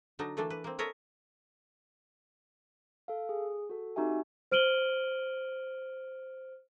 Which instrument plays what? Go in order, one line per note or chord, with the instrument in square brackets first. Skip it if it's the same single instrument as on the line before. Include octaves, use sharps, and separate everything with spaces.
[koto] D3 F#3 D4 D#4
E3 A3 A#3 D4 A4
B4
A#3 C4
A4 A#4 C#5 D#5 E5
[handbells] A4 F5
G#4
F#4 A4
C4 D#4 F#4 G4 E5 G#5
[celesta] C5 F6 D7 D#7 F#7 G7